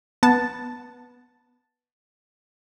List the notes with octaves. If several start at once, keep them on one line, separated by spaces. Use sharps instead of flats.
B3 A5